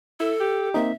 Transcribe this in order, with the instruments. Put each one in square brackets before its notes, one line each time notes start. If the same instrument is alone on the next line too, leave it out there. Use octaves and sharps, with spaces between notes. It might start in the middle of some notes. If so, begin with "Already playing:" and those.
[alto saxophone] E4 [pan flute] A4
[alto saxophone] G4
[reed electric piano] A#3 C4 D#4 [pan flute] E5